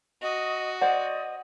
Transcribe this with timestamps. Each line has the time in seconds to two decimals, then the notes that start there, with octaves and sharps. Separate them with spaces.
0.22 F#4 D#5
0.81 C5 D5 D#5 F#5